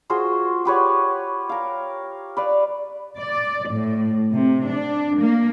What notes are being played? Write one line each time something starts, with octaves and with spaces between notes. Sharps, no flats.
F4 F#4 G#4 C5
G4 B4 C#5 F#5
A#4 F5
B4 D5 F5
D5
A2
C3
D4
A#3